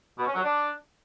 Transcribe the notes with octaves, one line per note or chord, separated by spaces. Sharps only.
B2
C#4
F#3
D4